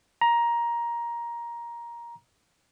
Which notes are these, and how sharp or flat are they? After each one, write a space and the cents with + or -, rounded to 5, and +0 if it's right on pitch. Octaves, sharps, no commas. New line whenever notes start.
A#5 +15